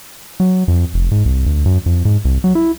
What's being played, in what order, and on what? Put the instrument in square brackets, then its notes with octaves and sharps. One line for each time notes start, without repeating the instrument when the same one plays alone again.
[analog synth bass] F#3
F2
F1
G#2
C2
D2
F#2
F2
G#2
C2
F#3
E4